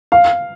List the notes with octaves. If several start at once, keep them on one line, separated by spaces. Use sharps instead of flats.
F5